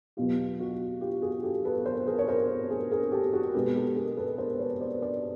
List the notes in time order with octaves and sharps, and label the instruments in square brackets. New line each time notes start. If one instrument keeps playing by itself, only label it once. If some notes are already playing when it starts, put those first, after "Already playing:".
[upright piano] E2 B2 F#3 B3 F4 G4
F#4
F4 G4
F#4 G#4
G4 A4
A4 B4
A#4 C5
G#4 A#4
C#5
A#4 C5
G#4 A#4
G#4 A#4
G4 A4
F#4 G#4
B2 G#3 B3 G4 A4
G4 A4
G#4 A#4
A4 B4
A#4 C5
B4 C#5
C5 D5
C5 D5